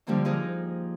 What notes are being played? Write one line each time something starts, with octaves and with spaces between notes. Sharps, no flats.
D3 F3 G3 A#3 D4
F3 D#4 G#4 A#4